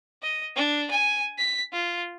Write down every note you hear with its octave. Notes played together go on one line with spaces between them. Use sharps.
D#5
D4
G#5
B6
F4